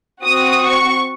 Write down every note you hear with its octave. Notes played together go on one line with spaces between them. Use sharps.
C4 F#4 D#6
C#6